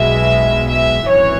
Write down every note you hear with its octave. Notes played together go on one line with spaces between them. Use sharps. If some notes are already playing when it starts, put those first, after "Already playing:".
Already playing: B1 B2 G#3 E5
E5
G#1 F#2 E3 C#5